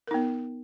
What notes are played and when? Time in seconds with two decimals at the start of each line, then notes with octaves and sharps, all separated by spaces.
0.07 A#4
0.11 D#4
0.14 B3